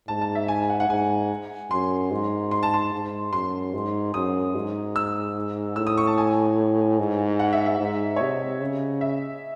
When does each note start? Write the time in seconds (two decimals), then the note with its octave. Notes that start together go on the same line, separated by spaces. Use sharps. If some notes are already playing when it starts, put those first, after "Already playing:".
0.08 G#2 A5
0.22 A5
0.35 E5
0.48 G#5
0.70 F#5
0.80 F#5
0.89 G#2 G#5
1.71 F#2 C6
2.11 G#2
2.51 C6
2.63 A5
2.74 C6
2.93 G#2
3.33 F#2 C6
3.74 G#2
4.14 F#2 D#6
4.55 G#2
4.96 E6
5.76 A2 E6
5.87 D#6
5.97 C#6
6.07 A5
6.18 G#5
6.99 G#2
7.39 F#5
7.53 E5
7.66 E5
7.80 G#2
8.16 C#5
8.20 C3 D#5
8.61 C#3
9.01 E5